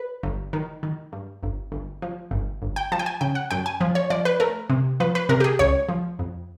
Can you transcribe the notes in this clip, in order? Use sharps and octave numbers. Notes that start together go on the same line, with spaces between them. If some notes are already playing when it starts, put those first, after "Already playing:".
Already playing: B4
G1
D#3
D#3
G2
G1
G1
F3
G1
G1
G5
F3 A5
G5
G#5
C#3 G5
F#5
F#2 G5
G#5
F3
C#5
F3 D5
B4
A3 A#4
C3
F3 B4
B4
C3 A#4
G4
G#4
C#2 C#5
F3
F2